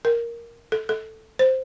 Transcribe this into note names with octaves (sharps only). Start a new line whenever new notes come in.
A#4
A4
A4
C5